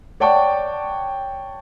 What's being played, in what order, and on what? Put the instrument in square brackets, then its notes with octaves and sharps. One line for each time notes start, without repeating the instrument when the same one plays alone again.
[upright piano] C#5 D5 F#5 G5 A5 C#6